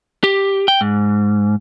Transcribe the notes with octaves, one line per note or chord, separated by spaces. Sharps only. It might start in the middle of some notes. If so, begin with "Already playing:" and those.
G4
G5
G#2